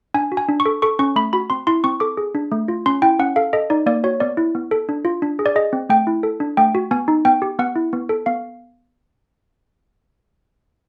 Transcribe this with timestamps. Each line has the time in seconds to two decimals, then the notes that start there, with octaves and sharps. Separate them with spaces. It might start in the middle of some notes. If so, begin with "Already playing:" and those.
0.14 D4 G#5
0.32 F#4
0.37 G#5
0.49 D4
0.60 C#6
0.66 A4
0.82 A4 C#6
0.99 C#4 C#6
1.16 A3 B5
1.33 F#4 B5
1.50 C4 C6
1.67 E4 C6
1.84 C4 C#6
2.00 A4 D6
2.17 G#4
2.35 D4
2.52 A3
2.68 F4
2.86 C#4 C6
3.02 E4 G5
3.19 C#4 F#5
3.36 A4 F5
3.53 A4 D#5
3.70 D#4 D5
3.86 A#3 D5
4.04 F#4 C#5
4.20 B3 D5
4.37 E4
4.55 B3
4.71 A4
4.89 D4
5.05 F4
5.22 D4
5.39 G#4
5.46 D5
5.56 G#4 D#5
5.73 C4
5.89 A3 G5
6.07 E4
6.23 A4
6.40 D4
6.57 A3 G5
6.75 F#4
6.91 B3 G#5
7.08 D#4
7.25 B3 G5
7.42 G4
7.59 B3 F#5
7.76 E4
7.93 B3
8.09 A4
8.26 B3 F5